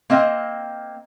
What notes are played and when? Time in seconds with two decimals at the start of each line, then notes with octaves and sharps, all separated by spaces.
0.10 A#3 C4 D#5